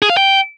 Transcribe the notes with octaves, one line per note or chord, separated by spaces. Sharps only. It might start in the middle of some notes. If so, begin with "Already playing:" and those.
G#4
F5
G5